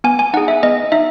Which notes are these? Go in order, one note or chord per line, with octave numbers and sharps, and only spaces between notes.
B3 G#5
G#5
D#4 G#4 F#5
E5
B3 D#5
D#4 E5